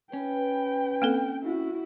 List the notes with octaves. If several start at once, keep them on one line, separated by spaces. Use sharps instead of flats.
C#4 B4 G5
A#3 C4 A4
E4 F#4